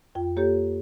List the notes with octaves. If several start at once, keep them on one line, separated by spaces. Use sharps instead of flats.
F2 F4 G5
A#3 G4 A4 C#5 G6